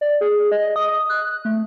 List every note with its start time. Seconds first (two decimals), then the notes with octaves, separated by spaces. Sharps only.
0.01 D5
0.21 G#4
0.51 D#5
0.76 D#6
1.09 F#6
1.45 A3